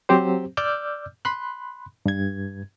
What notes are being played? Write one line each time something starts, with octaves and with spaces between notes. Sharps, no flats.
F#3 C4 G4 C5
D5 D6 E6 F6 G6
B5 C6 F#6
G2 G#6